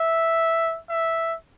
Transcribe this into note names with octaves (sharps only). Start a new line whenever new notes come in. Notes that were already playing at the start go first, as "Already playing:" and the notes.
Already playing: E5
E5